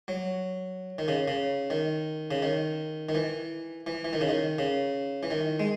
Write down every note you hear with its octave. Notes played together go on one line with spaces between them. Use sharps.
F#3
D#3
C#3
C#3
D#3
C#3
D#3
D#3
E3
E3
E3
D#3
C#3
D#3
C#3
E3
D#3
G#3